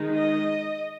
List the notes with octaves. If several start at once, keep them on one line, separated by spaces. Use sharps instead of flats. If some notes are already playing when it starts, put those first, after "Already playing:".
Already playing: D#3 G#3 D#4
D#5